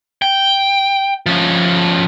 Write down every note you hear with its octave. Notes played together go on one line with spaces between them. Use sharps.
G5
F3 C#4